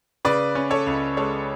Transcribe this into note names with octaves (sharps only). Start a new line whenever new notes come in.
C#3 B4 D5
C#4
A4 C#5
C#2
G#3 A4 C#5